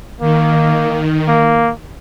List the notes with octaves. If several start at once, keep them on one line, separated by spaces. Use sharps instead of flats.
D#3 A#3
A#3